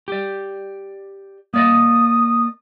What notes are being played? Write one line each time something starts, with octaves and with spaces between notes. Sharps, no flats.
G4 D5
A#3 D5 D#5 D#6